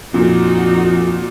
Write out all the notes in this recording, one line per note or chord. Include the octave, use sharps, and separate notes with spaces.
F2 A#2 D#4 F#4